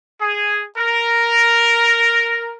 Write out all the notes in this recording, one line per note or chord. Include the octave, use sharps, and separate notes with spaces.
G#4
A#4